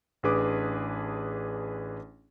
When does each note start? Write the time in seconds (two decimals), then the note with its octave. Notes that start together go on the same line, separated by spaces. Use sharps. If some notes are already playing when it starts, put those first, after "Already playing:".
0.23 A1 D4 G#4 B4 D6 D#6